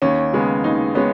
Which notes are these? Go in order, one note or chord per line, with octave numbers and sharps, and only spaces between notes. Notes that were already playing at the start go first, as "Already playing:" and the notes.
D#2 C#4
C#3 G#3 B3
D#2 D#4
G#3 B3 C#4